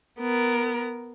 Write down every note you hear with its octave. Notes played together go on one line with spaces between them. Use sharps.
B3 A#4